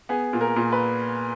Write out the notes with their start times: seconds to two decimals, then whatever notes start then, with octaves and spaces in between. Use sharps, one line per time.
0.09 B3 G#4
0.33 A#2
0.41 A#4
0.56 A#2
0.72 B4